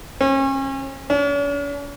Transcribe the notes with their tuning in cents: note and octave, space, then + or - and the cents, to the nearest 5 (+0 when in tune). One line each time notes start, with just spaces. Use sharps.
C#4 -35
C#4 +45